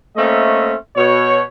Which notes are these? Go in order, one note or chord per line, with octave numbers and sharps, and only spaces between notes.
A3 A#3 C4 C#4 D#5 E5
B2 C#5